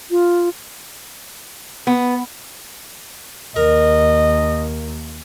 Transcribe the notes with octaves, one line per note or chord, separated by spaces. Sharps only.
F4
B3
D#2 A#4 D#5